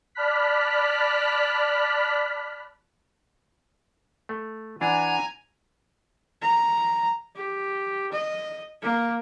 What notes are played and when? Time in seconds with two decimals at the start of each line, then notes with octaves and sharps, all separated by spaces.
0.15 D5 A5 B5 F6 F#6 B6
4.29 A3
4.81 E3 D4 F#5 G#5 A#5 G#6
6.42 A#5
7.36 G4
8.13 D#5
8.82 A#3